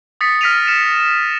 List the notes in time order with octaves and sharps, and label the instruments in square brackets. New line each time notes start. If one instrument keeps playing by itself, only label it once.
[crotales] D#6 A6 B6 C#7
F6 A#6 B6 D7 D#7 F7
F6 C#7 E7